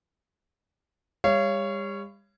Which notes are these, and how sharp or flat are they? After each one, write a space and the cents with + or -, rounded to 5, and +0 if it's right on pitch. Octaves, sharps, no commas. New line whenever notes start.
G3 +40 C#5 +0 F5 -35